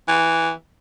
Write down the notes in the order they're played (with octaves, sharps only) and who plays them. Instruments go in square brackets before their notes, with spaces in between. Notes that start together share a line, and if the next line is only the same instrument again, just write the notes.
[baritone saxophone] E3